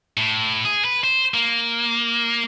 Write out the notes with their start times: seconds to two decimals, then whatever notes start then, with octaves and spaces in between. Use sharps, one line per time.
0.17 A2
0.65 G#4
0.84 B4
1.04 C5
1.34 A#3